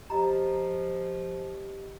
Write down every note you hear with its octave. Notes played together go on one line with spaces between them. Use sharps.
F3 G4 D#5 A#5